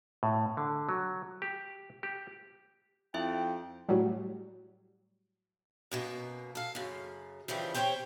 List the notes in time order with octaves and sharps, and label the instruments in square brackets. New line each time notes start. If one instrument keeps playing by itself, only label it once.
[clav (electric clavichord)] A2
D3
F#3
G4
G4
[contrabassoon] F2 [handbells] E4 E5 [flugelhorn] G5
[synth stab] A2 F#3 G3
[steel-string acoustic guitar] F#2 B2 A#3
A4 F5
F#2 C#3
C#3 E3 F3 G3 G4
G4 C5 C#5 E5 G5